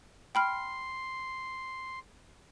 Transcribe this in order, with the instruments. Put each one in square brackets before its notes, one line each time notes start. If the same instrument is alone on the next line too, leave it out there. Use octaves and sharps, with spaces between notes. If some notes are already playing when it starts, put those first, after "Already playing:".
[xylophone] G5 B5 F6 [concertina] C6